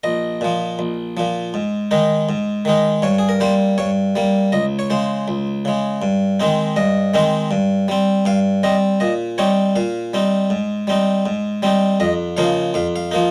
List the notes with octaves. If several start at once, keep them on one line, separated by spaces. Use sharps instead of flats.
A#1 D#5
A#2 F3
A#1
A#2 F3
G#2
D#3 G#3 D#4
G#2
D#3 G#3 D#4
G2 C#5
G#4
A#4
G3 A#3 C5
G2 C#5
G3 A#3
C#2 D#5
C#5
C#3 G#3 C5
C#2
C#3 G#3
G2
D#3 G#3 C4 D#4
G2 D#5
D#3 G#3 C4 D#4
G2
G3 C4
G2 F5
G3 C4 D#5
A#2 D#5
G3 C4 D#4 C#5
A#2 F5
G3 C4 D#4
G#2
G3 C4 D#4
G#2
G3 C4 D#4
F2 D#5
C#3 F3 A#3 D#4 F5
F2 F5
F5
F3 A#3 D#4